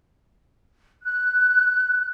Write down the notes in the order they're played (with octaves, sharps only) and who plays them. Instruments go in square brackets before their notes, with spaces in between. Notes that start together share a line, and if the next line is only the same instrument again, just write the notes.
[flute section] F#6